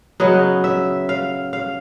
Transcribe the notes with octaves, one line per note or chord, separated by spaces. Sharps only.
C#3 F#3 B3 D#5
E5
F5
F5